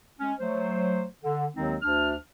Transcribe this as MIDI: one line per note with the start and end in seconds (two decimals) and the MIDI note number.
0.20 0.33 56
0.20 0.33 61
0.40 1.05 54
0.40 1.05 57
0.40 1.05 72
1.22 1.46 50
1.55 1.76 39
1.55 1.76 51
1.55 1.76 54
1.55 1.76 56
1.55 1.76 60
1.55 1.76 63
1.82 2.13 38
1.82 2.13 62
1.82 2.13 89